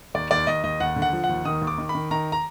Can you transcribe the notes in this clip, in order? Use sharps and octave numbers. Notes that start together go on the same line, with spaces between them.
D#2 D5
D#2 D5
D#2 D#5
D#2 D#5
D#2 F#5
D3
F#5
F3
F#5
D#2
D#3 D#6
D#2
D6
D#3
B5
D#3
D#3 A#5
A#5